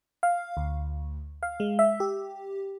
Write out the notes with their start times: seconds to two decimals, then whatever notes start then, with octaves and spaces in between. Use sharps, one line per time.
0.23 F5
0.57 D2
1.43 F5
1.60 G#3
1.79 E5
2.00 G4